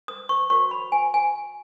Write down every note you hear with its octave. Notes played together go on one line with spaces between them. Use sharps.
D#6
C#6
F#4 A#4 C#5 C#6
B5
G#5
G#5